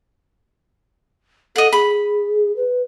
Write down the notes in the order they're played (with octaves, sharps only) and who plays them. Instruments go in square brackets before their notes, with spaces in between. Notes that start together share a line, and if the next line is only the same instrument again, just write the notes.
[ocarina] A4 [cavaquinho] D#5 F#5
[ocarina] G#4 [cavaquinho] B5
[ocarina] B4